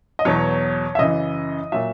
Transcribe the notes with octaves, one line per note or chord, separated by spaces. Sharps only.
D#5
E2 B2 F#3 C#5
E5
F#2 C#3 E3 D#5
A#2 F#3 E5